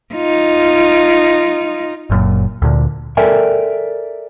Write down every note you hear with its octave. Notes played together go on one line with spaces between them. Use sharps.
D#4 F4
F#1 F#2 A#2
D2 A#2 D3
A4 A#4 D5 E5 G5 G#5